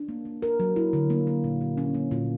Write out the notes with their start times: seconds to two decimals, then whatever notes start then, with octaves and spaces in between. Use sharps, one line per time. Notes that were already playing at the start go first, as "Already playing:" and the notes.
Already playing: D4
0.09 A#3
0.25 A#3
0.42 A#4
0.60 F#3
0.76 E4
0.93 D3
1.10 A#3
1.27 A#3
1.44 A#2
1.61 A#2
1.77 C#4
1.94 A#3
2.11 A#2